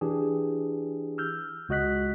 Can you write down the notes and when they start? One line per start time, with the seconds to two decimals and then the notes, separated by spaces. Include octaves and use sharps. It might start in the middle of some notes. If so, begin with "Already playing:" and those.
0.01 E3 D4 G4 G#4
1.18 E6 F6 G6
1.69 C#2 F#4 D#5 F#6 B6